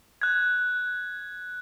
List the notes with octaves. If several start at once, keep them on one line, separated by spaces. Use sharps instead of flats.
F#6 G#6